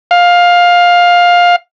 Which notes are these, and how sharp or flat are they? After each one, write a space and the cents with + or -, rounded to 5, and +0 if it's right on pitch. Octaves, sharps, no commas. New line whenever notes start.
F5 +15